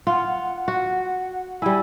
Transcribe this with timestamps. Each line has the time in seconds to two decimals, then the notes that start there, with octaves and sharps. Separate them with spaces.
0.07 F4 F#5
0.68 F#4
1.62 G3 E4 G#5